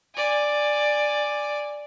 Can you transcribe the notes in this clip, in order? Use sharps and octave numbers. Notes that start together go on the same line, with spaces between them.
D5 G#5